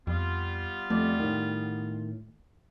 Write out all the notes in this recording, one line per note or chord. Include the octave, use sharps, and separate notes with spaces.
F2 G3 B3 F4
F2 A3 D5
A2 D#3